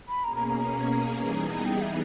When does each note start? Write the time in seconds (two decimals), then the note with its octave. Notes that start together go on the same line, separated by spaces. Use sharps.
0.08 B5
0.24 B2 A#3 C#4 G#4 A#5
0.36 A#5
0.48 A#5
0.59 A#5
1.18 E3 G3 B3 D#4 G#4 A#5
1.35 A#5
1.50 A#5
1.66 G5
1.81 E5